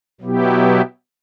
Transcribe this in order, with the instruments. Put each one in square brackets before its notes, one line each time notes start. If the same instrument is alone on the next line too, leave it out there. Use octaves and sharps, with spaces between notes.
[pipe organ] B2 F#3 B3 E4 G4